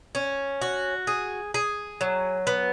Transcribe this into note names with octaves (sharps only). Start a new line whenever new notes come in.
C#4
F#4
G#4
G#4
F#3
B3